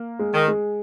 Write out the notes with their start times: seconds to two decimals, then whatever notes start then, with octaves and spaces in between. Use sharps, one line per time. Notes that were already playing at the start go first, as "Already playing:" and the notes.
Already playing: A#3
0.19 G#3
0.34 D#3
0.48 G#3